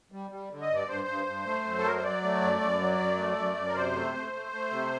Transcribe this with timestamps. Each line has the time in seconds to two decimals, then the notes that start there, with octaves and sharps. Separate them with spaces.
0.12 G3
0.31 G3
0.51 D3
0.62 D#5
0.70 G2
0.75 D5
0.88 G2 C5
1.08 G2
1.27 G2
1.45 A3
1.64 F#2
1.78 A4
1.84 F#3 A#4
1.95 C5
2.03 F#3 D5
2.23 A3
2.41 F#2
2.60 F#2
2.79 F#3
2.99 F#2
3.18 A3
3.37 F#2
3.57 F#2
3.68 A#4
3.75 C3 C5
3.94 A3
4.14 A3
4.33 A3
4.52 A3
4.71 C3